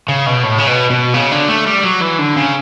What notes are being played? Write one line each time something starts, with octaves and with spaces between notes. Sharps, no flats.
C#3
B2
A2
C#3
B2
B2
C#3
D3
A3
G3
F#3
E3
D3
C#3